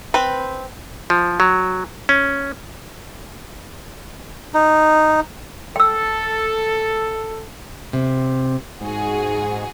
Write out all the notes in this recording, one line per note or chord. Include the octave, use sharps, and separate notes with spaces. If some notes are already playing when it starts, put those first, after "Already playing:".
C4 B4
F3
F#3
C#4
D#4
A4 G5 E6
C3
G#2 F#4 G#4